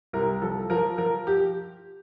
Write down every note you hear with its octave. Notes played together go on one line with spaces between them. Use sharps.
C2 A#4
F3 A4
F3 A#4
F3 A#4
G4